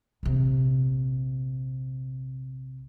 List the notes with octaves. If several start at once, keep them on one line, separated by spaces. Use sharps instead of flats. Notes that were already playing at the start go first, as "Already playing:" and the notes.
A#1 C3